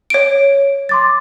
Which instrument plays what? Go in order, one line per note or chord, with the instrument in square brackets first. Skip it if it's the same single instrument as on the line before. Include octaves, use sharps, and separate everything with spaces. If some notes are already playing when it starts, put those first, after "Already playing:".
[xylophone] C#5 D7
[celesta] C6 D6 A6